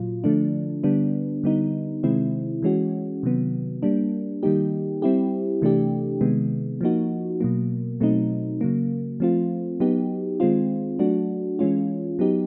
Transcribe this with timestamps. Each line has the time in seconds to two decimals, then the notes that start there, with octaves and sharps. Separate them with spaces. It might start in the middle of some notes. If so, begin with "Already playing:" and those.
Already playing: A#2 F#3 F4
0.24 D3 F3 A3 D4
0.84 D3 G3 B3 D4
1.44 D3 G3 B3 D#4
2.03 C3 D#3 G#3 C4 E4
2.62 E3 G#3 C#4 F#4
3.23 C3 D#3 F#3 B3
3.83 G3 A#3 D4
4.43 D#3 G3 A#3 D#4 G4
5.02 G3 C4 E4 G4
5.62 C3 E3 A3 D4 G4
6.21 C3 D#3 G#3 B3
6.81 F3 A#3 D#4 F#4
7.40 B2 F#3 A#3
8.00 B2 F#3 A3 C4 D#4
8.61 C#3 F#3 A#3
9.20 F3 A3 C4 F4
9.80 F#3 B3 D#4 G4
10.40 D#3 G#3 C4 F4
10.99 F#3 A3 D4 F#4
11.59 E3 G#3 C#4 F4
12.19 F#3 B3 D#4 G4